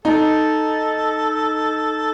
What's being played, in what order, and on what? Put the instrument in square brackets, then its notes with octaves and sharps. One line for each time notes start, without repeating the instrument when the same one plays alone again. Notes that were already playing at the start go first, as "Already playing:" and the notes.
[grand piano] D#4 [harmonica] A4